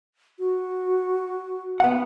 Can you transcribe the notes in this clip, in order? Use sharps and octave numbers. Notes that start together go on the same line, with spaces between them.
F#4
B3 F#5